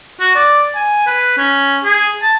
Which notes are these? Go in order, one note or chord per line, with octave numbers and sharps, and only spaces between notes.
F#4
D5
G#5
B4
C#4
G#4
A5